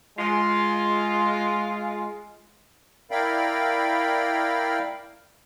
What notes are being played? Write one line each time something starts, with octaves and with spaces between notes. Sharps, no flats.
G#3 F4
E4 A#4 D5 F5 G5 B5